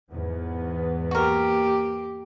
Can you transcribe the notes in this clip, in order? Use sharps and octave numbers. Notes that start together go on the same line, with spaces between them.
E2 G#2 B3
A#3 F#4 G4 A#4